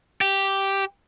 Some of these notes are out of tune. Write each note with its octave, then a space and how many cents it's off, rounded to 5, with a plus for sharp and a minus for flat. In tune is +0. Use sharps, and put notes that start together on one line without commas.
G4 -5